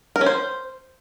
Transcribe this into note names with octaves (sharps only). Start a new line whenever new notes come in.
A#4
C#4
C5